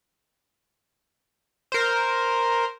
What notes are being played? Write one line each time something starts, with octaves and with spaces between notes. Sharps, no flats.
A#4 C5